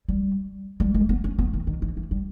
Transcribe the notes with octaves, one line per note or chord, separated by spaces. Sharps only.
G3
G3
G#3
B3
C#4
B3
D#3
D#3
E3
E3
G3